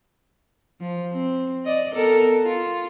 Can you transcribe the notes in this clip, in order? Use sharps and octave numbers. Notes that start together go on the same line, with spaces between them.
F3
C4
D5 D#5
B3 A4 A#4
F4